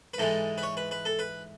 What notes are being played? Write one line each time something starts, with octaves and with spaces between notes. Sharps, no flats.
B4
G#2 E3 G#3 A4
B4
C#5
B4
B4
A4
B4